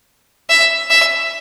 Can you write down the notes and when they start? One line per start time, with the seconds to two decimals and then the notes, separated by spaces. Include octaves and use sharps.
0.50 E5
0.90 E5